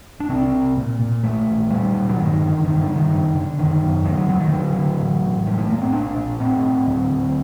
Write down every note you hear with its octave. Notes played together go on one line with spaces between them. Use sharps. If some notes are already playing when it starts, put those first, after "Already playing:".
D4
C2 C4
C2
A#2
A#2
A#1 A3
A#1
A#2 G3
A#2
F#3
G1 D#3
D3
G1 D#3
D3
G2
D#3
F#1
D3
F#1 D#3
F#2
D2 D#3
F#3
D2 F#3
D#3
D3 F#3
D3
A1
A1
A2 G3
A3
A2 A#3
C4
A#1 D4
A#1
A2 C4
A2
D2
D2